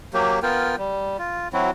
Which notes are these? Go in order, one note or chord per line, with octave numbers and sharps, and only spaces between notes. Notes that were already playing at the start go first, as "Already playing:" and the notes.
F#3 A#3 G4
B3 F4 A#4 G5
G3
F4
F#3 C4 E4 F#4